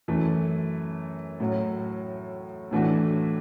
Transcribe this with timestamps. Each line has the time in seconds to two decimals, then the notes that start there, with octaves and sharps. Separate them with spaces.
0.08 F#2 E3 A3
1.40 A2 F#3 C#4
2.71 A2 E3 A3 D4 F#4